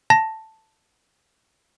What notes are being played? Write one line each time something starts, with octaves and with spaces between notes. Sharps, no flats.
A5 A#6